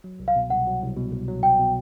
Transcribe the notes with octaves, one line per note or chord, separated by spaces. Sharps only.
F#3
C2
F5
B2
C2 F#5
F#3
C2
B2
C2
F#3
C2 G5
B2